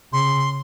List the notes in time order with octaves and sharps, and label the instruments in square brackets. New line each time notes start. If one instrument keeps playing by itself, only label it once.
[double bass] C#3 [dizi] C6